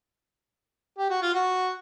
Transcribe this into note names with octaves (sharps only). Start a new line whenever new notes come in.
G4
F#4
F4
F#4